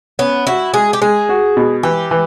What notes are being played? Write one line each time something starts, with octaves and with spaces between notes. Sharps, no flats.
B3 C#4
E4 F#4
G#3 G#4
G4
G#3 G#4
F#4
B2
E3 G4
E3